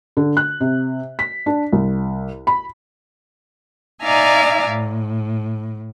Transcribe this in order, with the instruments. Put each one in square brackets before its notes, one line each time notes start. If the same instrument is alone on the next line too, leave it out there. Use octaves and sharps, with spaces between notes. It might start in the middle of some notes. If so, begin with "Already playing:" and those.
[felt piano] D3
F#6
C3
B6
D4
C2
B5
[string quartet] D#4 D5 E5 F5 G#5 A#5
A2